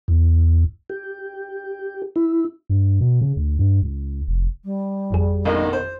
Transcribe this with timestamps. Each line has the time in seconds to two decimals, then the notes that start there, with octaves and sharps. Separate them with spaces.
0.08 E2
0.90 G4
2.16 E4
2.70 G2
3.01 B2
3.21 C#3
3.37 D2
3.59 G2
3.82 C#2
4.27 F1
4.65 G3
5.10 G#1 F2 G#4
5.45 A1 B2 D3 D#3 A#3
5.73 C5